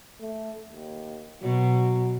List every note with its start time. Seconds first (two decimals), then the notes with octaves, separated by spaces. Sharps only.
0.21 A3
0.69 D#2
1.43 B2 F#3